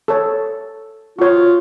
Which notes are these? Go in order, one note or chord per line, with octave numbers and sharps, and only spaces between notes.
A4 C#5
F4 F#4 C#5